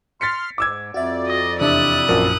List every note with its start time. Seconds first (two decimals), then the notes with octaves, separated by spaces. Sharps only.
0.21 C6 F6 A6 B6 C#7
0.58 G#2 D6 E6 G#6
0.94 F2 F#4 D5 E5
1.27 D#5
1.61 E2 C3 D4 E4 E5 D#6 F#6
2.09 A#1 F#2 F3 A#4